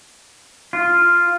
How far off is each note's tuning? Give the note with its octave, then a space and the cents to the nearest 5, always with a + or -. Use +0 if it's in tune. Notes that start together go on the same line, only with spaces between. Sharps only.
F4 -5